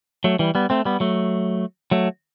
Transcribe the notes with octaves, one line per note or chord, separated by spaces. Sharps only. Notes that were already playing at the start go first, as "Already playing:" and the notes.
F#3 A3
E3 G3
G3 B3
A3 C4
G3 B3
F#3 A3
F#3 A3